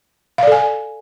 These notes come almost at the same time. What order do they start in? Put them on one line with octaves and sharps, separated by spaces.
F5 D5 A4 G#5